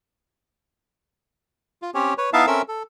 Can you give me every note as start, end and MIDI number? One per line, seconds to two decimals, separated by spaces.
1.82 1.90 65
1.94 2.14 60
1.94 2.14 61
1.94 2.14 67
1.94 2.14 73
2.18 2.30 71
2.18 2.30 73
2.33 2.46 59
2.33 2.46 63
2.33 2.46 64
2.33 2.46 76
2.33 2.46 77
2.33 2.46 81
2.47 2.62 60
2.47 2.62 61
2.47 2.62 69
2.47 2.62 70
2.47 2.62 76
2.47 2.62 88
2.68 2.83 69